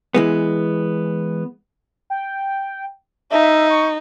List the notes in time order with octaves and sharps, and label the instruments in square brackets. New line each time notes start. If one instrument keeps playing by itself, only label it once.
[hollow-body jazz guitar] E3 G#3 B3
[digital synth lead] G5
[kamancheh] D#4 [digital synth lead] E5
[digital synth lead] C#6